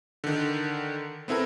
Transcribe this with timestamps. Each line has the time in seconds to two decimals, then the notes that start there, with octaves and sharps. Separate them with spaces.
0.24 D3 D#3
1.28 B3 C4 E4 A4 A#4